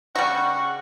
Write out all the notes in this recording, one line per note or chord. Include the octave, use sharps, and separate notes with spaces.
C#3 G3 F#4 F5 F#5 C#6